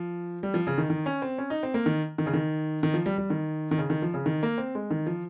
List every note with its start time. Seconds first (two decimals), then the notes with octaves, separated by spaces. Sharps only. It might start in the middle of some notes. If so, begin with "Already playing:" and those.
Already playing: F3
0.43 G3
0.54 F3
0.67 C#3
0.78 D#3
0.90 D#3
1.06 C#4
1.22 C4
1.38 C#4
1.50 D#4
1.63 C4
1.74 A#3
1.86 D#3
2.18 D#3
2.26 C#3
2.33 D#3
2.83 D#3
2.94 F3
3.06 G3
3.18 G3
3.30 D#3
3.71 D#3
3.78 C#3
3.90 D#3
4.02 F3
4.14 C#3
4.26 D#3
4.43 A#3
4.58 C4
4.75 G#3
4.91 D#3
5.07 F3